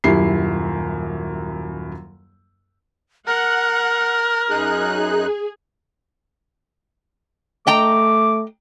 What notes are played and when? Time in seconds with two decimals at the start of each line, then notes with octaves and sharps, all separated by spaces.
0.04 D#1 F#2 E4 G4 C7
3.27 A#4 F#5 F6 F#6
4.50 F#2 D#4 G#4 F#6
7.67 A3 D#5 G5 A#5 D6